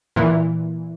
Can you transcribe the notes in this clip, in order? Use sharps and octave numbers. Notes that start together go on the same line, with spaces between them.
A#2 E3